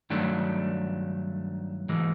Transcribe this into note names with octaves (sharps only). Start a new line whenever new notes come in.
G2 D#3 F#3 A3 D4
G#2 E3 G#3